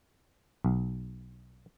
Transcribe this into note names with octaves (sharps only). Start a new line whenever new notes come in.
B1